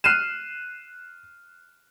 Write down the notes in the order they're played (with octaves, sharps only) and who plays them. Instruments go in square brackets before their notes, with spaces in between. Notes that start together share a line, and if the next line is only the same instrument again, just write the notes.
[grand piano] F6 F#6 C7 D#7 E7